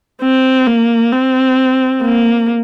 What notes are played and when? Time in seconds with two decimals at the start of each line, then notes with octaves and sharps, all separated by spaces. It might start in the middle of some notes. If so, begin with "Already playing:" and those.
0.22 C4
0.67 A#3
1.13 C4
2.02 A#3